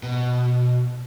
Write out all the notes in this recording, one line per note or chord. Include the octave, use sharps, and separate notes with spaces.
B2